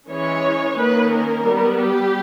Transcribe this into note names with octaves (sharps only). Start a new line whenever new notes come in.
E3 G#3 C#4 C#5
D#3 A#3 C#4 B4
A#4
G3 B3
G4